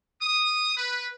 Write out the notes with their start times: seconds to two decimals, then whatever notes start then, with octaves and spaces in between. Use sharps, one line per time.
0.22 D#6
0.77 B4